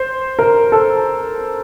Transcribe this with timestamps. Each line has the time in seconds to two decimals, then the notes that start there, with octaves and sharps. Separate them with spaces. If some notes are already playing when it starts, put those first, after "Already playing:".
Already playing: C5
0.39 A#4
0.72 A4